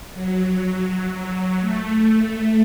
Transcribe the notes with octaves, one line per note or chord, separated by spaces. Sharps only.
F#3
F#3
A3